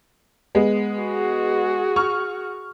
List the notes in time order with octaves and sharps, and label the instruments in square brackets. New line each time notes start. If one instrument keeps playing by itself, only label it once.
[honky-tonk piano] G#3 B3
[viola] F#4 G#4
[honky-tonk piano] C#6 F6